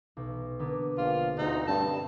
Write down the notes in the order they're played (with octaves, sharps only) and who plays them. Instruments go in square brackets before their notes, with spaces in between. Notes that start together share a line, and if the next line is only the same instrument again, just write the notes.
[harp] B1
D3 A#3 B3
[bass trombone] A#1 [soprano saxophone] F4
[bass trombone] D2 [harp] C4 E5 [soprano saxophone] D#4
[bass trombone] G2 [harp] C4 [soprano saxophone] A5